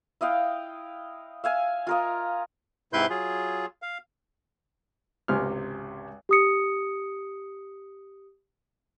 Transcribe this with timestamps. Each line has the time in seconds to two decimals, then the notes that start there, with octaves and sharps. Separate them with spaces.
0.21 E4 D#5 F5 G5
1.44 E5 F5 G#5
1.87 F4 A#4 D#5
2.93 G#2 C3 E4 B4 C6 G6
3.10 F#3 F4 G#4
3.82 F5
5.28 G#1 C#2 C3 F6
6.29 G4 D#6 C#7